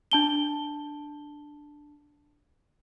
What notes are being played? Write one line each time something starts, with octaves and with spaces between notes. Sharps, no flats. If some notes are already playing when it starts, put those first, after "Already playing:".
D4 A5 G7